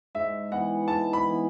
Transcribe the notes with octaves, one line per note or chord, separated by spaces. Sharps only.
G#2 E5
E3 B3 F#5
G#2 A5
B5
E3 B3